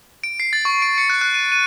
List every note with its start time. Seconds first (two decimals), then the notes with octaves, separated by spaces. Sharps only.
0.24 D7
0.40 C7
0.53 A6
0.65 C#6
0.82 D7
0.98 C#7
1.10 F#6
1.21 F#6
1.34 D#7
1.52 D#7